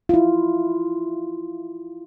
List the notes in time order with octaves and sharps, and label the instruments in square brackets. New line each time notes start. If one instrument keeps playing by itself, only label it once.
[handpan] E4 F4